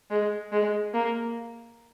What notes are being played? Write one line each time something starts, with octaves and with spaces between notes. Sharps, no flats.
G#3
G#3
A#3